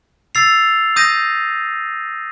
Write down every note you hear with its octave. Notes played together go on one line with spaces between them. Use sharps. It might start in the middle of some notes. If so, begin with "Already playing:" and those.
E6 A6 C7 F7
D#6 G6 A#6 D#7